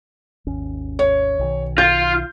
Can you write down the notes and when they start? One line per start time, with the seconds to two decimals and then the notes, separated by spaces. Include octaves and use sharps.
0.47 G#1 D#2 C#4
0.99 C#5
1.39 B1 D#3
1.78 F4 G6